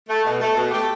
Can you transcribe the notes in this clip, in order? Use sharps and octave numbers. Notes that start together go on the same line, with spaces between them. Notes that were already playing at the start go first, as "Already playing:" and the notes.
A3
B2
A3
B2
A3 G4